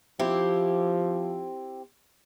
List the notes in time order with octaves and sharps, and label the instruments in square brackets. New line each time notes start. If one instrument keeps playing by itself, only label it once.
[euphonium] F3 [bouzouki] C4 E4 G4